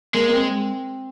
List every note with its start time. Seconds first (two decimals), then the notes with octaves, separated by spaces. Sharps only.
0.14 G#3 A#3
0.28 A#3
0.32 C4